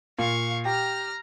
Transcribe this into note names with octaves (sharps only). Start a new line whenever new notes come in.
A#2 F5 C#6
G4 A#5 F6